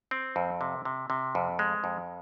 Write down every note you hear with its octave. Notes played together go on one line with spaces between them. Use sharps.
C4
F2
C3
C3
C3
F2
G#3
F2